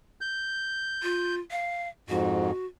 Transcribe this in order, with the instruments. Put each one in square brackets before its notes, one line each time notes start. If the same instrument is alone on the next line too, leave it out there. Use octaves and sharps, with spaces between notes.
[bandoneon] G6
[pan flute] F4
F5
[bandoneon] F2 G#2 [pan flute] F#4